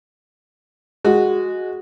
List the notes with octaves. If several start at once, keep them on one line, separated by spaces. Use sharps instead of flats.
G#3 F#4